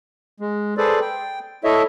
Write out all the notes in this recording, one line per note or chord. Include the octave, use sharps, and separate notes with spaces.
G#3
G#4 A4 B4 C5 D5
G5
E4 A4 C#5 D#5 E5